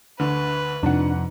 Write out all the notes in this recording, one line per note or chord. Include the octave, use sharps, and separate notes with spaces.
D2 D3 B4
F2 G#2 C3 F3 D4 F#5